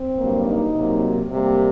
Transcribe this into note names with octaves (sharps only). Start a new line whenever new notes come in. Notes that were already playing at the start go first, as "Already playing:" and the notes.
Already playing: C4
G2 F#3 A#3
D#4
C3 F#3 A#3
C3 G3 A#3